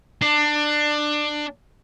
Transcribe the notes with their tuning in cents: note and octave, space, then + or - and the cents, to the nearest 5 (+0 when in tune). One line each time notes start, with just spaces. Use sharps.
D4 +20